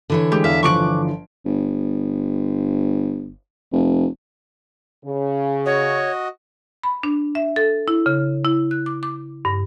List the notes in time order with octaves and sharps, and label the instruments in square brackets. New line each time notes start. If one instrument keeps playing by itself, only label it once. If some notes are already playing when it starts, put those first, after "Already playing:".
[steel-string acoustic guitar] D3 E3 C#5
[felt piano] G#3 [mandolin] G4
[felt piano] E2 [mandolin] E5 F5
[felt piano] G1 F3 D7 [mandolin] C#6 D6 F#6
[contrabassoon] G1
F1
[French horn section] C#3
[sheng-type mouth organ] F#4 D#5 [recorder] C#5
[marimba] B5
D4
E5
A4
E4
C#3
E4
F#6
D6
D6
G2